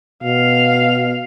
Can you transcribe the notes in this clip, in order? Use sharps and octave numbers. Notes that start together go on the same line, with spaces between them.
B2 F5